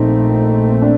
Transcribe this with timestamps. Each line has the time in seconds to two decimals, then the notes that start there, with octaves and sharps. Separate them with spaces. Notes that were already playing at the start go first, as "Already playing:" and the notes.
Already playing: A#1 A#2 A3 C4 D#4
0.82 D4